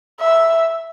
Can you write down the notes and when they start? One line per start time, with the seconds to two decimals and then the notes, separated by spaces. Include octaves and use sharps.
0.20 E5